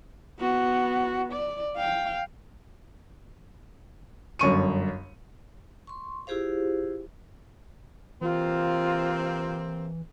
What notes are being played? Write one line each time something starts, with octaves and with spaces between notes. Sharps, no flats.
B3 F#4
D5
F5 G5
G1 F#2 C#6 D#7
C6 C#6
E4 F4 G4 G#4 C5 F5
C3 E3 A#3 C4 F4